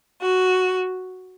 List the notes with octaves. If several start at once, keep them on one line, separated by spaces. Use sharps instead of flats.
F#4